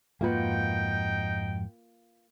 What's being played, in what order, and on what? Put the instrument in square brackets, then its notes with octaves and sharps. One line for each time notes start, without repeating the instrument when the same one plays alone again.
[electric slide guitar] F2 G#2 F#4 [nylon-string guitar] A#3 F4 B4 [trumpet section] D#4 G5